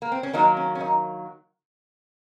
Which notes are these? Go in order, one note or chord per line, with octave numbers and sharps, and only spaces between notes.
A#3
C4
C#4
D#3 F#3 A#3 D#4
C#4
C#4
D#4